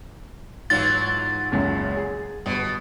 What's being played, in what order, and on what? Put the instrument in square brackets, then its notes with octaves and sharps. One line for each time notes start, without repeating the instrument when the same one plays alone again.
[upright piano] G#2 [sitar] E3 F#3 F4 [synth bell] A6
[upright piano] F#1 C#2 F#2
G#4
[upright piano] G1 [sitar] B2